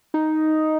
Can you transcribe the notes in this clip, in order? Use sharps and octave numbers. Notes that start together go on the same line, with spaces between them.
D#4